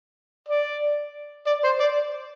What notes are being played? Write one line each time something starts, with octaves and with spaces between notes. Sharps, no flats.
D5
D5
C5
D5